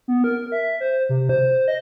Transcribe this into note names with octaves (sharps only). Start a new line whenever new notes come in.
B3
A#4
E5
C5
C3
C5
D#5